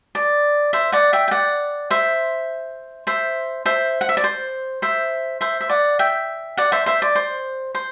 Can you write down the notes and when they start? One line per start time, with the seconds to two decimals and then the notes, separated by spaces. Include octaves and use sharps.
0.15 D5
0.73 C5 E5
0.92 D5 F#5
1.13 E5 G5
1.28 G5
1.31 D5 F#5
1.90 C5 E5
3.07 C5 E5
3.66 C5 E5
4.01 F#5
4.09 E5
4.17 D5
4.24 C5
4.82 C5 E5
5.41 C5 E5
5.60 E5
5.69 D5 F#5
5.99 E5 G5
6.57 D5 F#5
6.72 C5 E5
6.86 C5 E5
7.02 D5
7.15 C5
7.75 C5